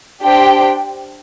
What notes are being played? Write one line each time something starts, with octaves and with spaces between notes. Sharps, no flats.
D4 G4 C5 G5